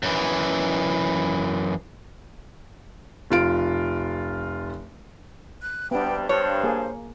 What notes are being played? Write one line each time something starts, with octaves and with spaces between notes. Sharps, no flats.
F#2 E3
F1 F4 D7
F#6
G2 C3 G3 B3 D4 G5
G2 C5 C#5
A#3 G#4